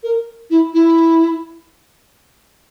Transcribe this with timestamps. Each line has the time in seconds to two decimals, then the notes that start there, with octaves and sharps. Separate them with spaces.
0.03 A#4
0.50 E4
0.73 E4